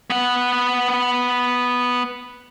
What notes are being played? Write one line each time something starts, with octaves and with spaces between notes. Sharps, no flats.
B3 F#5